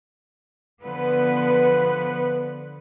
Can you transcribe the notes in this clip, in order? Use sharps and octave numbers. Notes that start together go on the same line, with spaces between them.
D3 F3 B3 B4